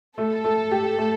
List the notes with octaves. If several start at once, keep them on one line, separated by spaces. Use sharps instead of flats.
A3 A4
A3
G4
A3